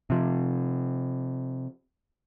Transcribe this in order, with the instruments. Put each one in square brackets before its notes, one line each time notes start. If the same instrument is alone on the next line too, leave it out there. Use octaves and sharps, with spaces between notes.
[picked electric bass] C3 F3